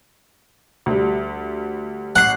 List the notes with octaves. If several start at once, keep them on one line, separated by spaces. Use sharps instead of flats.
D2 G3
A1 F#5 C7